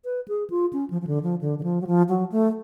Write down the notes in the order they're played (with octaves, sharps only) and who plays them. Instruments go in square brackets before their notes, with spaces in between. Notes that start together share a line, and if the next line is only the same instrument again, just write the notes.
[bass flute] B4
G#4
F4
C#4
F3
F3
D3
F3
D3
D3
F3
F#3
F3
F#3
A3